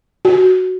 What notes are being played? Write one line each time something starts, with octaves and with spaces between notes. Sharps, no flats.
F#4